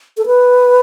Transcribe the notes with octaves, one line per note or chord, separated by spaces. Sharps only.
A4
B4